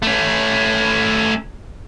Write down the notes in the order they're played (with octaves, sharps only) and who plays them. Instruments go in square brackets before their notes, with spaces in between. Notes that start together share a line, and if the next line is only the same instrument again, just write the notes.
[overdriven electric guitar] A3 C#4